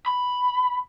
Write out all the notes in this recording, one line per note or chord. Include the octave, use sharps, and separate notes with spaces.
B5